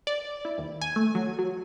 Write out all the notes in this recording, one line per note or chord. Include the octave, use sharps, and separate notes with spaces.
D5
E4
D#2
G#5
A3
F#3
F#3